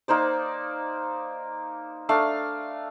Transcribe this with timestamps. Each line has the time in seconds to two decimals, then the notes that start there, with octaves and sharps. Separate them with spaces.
0.08 A#3 D#4 C5 D5
2.09 A3 D4 F5